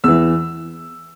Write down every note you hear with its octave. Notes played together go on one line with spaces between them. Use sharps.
E2 E3 E6